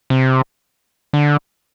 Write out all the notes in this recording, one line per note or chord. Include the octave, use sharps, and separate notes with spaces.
C3
D3